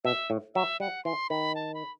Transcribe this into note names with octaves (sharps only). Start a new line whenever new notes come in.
B2 E5
A2
F#3 E5
G3 F#5
E3 C6
D#3 B5
A5
B5